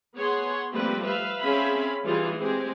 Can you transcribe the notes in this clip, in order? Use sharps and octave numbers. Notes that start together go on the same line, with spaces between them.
B3 G#4 C#5 F#5 C6
F3 G3 A3 A#3 C4 B4
B4 E5 F5
C4 C#4 G#4 E5 F5 B5
E3 G3 F4 G#4
G#3 C4 G4 G#4